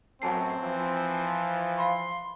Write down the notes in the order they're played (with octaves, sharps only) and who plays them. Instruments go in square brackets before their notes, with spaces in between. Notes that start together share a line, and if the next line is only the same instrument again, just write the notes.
[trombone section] A1 F#2 F#3 [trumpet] C4 [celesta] G#5 A5 C7
[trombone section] E3 F3
[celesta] F5 B5 [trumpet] C6